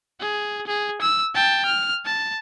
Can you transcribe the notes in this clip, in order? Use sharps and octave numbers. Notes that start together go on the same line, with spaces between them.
G#4
G#4
E6
G5 A5
F6
A5